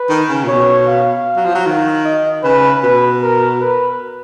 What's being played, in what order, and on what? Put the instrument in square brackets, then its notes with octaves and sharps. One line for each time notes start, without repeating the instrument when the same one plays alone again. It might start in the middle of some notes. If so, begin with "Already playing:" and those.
Already playing: [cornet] B4
[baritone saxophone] D#3
C#3
A#2
[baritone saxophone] B2 [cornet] C#5
[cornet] F5
[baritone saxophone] F#3
F3
F#3
D#3
[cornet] D#5
[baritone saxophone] C#3 [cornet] B4
[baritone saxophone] B2 [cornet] B4
[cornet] A#4
B4